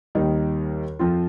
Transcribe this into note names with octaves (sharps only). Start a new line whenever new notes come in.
D#2 D#3 G3 D#4
F2 F3 C4 F4